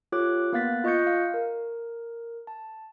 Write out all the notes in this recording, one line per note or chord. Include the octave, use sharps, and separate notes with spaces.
F4 G4 A4 C#5 D6 F#6
A#3 B3 F5 F#6 A6 B6
F4 D#5 C#6 F#6 G6 C#7
F5
A#4
A5